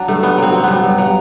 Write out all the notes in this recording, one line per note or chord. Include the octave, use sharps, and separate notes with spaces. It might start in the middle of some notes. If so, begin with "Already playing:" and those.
Already playing: F#3 D4
G2 A3
G2 B3
F#3 C4
F#3
G2 B3
G2
F#3